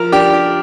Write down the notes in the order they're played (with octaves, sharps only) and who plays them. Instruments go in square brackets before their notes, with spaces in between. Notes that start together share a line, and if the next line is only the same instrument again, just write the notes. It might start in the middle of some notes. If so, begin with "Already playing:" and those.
Already playing: [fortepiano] F3 A#4 A#5
D4 G4 G5
G4